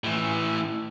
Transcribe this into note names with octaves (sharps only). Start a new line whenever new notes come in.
A2 E3